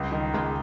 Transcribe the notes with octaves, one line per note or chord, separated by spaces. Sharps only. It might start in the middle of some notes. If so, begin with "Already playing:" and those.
Already playing: C#2 G3
D#3
C#2 G#3